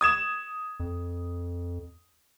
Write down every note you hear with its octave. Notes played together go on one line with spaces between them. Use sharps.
D#6 G#6 E7
F2